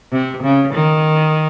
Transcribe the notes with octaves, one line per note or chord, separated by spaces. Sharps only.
C3
C#3
D#3